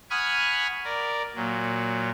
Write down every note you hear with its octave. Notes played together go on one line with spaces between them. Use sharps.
F#5 G#5 B5 C#6 D#6 F6
A#4 D5
A#2 F#3